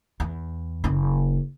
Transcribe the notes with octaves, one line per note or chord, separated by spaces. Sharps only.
E2
F#1 C#4